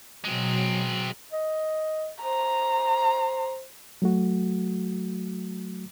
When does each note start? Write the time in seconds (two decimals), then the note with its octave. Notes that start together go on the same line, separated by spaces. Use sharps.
0.24 B2 F#3 G#3 C4
1.33 D#5
2.23 C5 A#5
4.02 F#3 A3 F#4